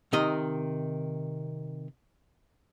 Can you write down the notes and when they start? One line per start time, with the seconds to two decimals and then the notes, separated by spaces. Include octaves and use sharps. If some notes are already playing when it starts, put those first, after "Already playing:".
0.13 C3 D#3 D#5